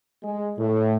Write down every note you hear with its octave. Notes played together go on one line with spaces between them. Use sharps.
G#3
A2